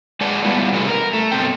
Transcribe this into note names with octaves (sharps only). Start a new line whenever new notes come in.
G#3 B4 D5 F#5 A5
G3 B3 E4 F4
C3 E3 G3 A3 C#4 B4
A#4
A3
F#2 B2 C4 G5